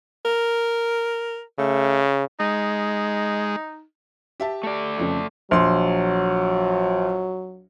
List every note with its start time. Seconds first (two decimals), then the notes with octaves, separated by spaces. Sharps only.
0.25 A#4
1.59 C#3 A3
2.40 G#3 D#4
4.40 G4 E5 A5
4.63 A3 D5
4.98 F2 C#3 F3
5.51 A#1 F#3 C6